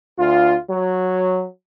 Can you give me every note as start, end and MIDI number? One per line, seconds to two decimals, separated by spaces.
0.18 0.55 38
0.18 0.55 65
0.69 1.45 54